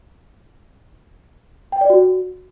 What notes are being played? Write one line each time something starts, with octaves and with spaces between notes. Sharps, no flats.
G5
D5
F#4